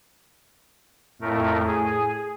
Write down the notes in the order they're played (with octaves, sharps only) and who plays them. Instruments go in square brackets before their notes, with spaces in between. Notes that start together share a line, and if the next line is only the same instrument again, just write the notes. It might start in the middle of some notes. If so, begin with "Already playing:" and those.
[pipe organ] F2 A3 A#4 [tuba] A2
[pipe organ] G#4